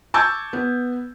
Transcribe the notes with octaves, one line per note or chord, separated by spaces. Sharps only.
A5 C#6 D6 E6 G6 G#6
B3